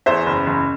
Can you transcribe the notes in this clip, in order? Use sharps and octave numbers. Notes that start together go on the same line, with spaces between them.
E2 C5 E5
F#1
F#1